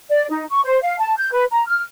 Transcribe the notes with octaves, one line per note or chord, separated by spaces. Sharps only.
D5
D#4
C#6
C5
F5
A5
G6
B4
A#5
F6